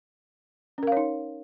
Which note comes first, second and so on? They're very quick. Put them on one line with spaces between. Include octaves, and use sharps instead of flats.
C#4 A#4 F5 C#5 D#4